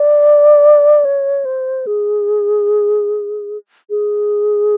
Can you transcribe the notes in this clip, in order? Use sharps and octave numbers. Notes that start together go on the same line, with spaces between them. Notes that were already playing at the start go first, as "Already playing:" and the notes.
Already playing: D5
C#5
C5
G#4
G#4